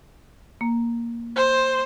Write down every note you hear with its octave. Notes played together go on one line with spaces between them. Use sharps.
A#3
C5